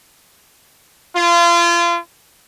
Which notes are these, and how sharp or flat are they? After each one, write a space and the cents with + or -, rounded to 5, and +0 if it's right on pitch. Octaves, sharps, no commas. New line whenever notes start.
F4 -30